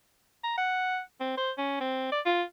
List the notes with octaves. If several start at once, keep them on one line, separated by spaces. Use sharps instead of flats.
A#5
F#5
C4
C5
C#4
C4
D5
F4